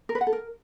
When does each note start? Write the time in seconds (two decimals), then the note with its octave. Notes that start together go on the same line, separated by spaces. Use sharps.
0.09 A#4
0.15 B4
0.21 F#5
0.27 A4
0.33 A#4